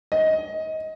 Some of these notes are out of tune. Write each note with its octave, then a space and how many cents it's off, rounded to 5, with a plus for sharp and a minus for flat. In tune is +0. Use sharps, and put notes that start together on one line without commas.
D#5 +20